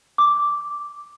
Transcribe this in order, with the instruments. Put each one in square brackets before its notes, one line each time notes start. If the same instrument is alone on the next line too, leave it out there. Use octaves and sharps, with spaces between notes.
[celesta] D6